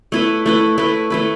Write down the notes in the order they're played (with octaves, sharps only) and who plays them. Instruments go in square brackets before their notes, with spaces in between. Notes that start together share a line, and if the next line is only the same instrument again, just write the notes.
[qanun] A3 E4 B4
A3 E4 B4
A3 E4 B4
A3 E4 B4